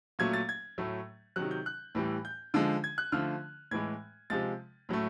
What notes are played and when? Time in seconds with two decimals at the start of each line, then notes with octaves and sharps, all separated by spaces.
0.19 A#2 F#3 A3 G#6
0.34 A6
0.49 G#6
0.78 A2 F#3 A3
1.36 C3 D#3 F#3 F#6
1.51 G6
1.66 F#6
1.95 A2 E3 G3
2.25 G6
2.54 D3 F3 G#3
2.84 G#6
2.98 F#6
3.12 D3 F3 A3 F6
3.71 A2 E3 G#3 G#6
4.30 C3 F3 G#3 A6
4.89 A2 F#3 A3